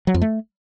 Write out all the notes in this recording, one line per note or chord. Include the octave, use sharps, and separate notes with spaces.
F#3
F2
A3